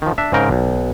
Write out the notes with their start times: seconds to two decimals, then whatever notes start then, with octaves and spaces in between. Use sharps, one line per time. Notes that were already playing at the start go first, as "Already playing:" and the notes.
0.02 D#3 F3
0.18 D4 E5
0.32 G#2 C#3 C4 A#4 G5
0.51 B1